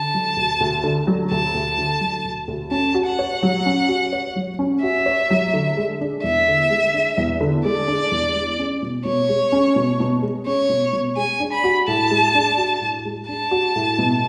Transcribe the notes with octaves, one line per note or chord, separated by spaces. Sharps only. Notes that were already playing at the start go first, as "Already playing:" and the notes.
Already playing: D3 A5
F#3
D2
D2
D3
F#3
D2 A5
D2
D3
F#3
D2
D2
C#4 A5
F#4
F#5
C#5
F#3
C#4
F#4
C#5
F#3
C#4
F#4 E5
C#5
F#3
D3
G#3
D4
E2 E5
D3
G#3
D4
E2
D3
G#3 D5
D4
E2
G#3
C#4
B2
B2 C#5
G#3
C#4
B2
B2
G#3
C#4 C#5
B2
B2
G#3 G#5
D4
B5
F#4
A2 A5
G#3
D4
F#4
A2
G#3
D4 A5
F#4
A2
B2